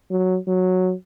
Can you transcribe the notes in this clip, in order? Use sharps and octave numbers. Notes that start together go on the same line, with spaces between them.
F#3
F#3